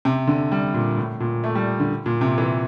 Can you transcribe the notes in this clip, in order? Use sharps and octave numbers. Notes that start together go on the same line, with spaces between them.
C3
D3
G3
A#2
A2
A#2
A3
G3
D3
A#2
C3
E3